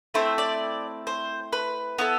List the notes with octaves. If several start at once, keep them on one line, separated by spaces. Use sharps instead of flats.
A3 C4 E4 C5
D5
C5
B4
B3 E4 A4